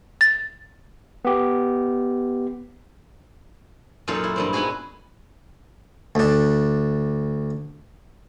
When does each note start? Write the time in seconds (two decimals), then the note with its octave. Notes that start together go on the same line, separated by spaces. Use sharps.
0.21 A6
1.25 B3 G4
4.08 F#2 A#2 D#4 F4 A4 F5
4.23 E4
4.36 G2 A#2 C4
4.53 B3 D#4 E4 F#4 G#4
6.15 D2 D4